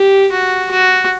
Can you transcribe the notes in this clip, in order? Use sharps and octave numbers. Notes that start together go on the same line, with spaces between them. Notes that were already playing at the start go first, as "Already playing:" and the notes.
Already playing: G4
F#4
F#4